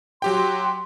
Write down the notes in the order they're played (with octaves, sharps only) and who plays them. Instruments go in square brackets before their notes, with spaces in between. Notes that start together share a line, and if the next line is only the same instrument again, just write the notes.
[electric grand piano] F#3 G4 G5 [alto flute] C6